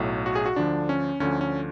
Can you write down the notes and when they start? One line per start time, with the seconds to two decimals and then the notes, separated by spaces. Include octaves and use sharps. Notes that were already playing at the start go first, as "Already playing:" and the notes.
Already playing: B1 A2 F#3
0.26 F#4
0.35 G#4
0.46 F#4
0.56 D2 D3 F3 D4
0.89 C#4
1.20 D2 D3 F3 C#4
1.41 C#4